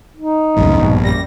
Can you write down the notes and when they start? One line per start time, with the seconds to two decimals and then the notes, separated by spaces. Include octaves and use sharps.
0.16 D#4
0.57 C#2 F#2 A2
0.80 A#1 G2 B2
1.03 F#2 G3 A#6